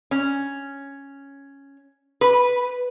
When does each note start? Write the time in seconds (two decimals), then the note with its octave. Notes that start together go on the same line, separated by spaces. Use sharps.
0.11 C#4
2.21 B4